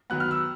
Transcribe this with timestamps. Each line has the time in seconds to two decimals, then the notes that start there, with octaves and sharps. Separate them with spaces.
0.10 D#3 F#3 B3 F#6
0.20 F6
0.31 E6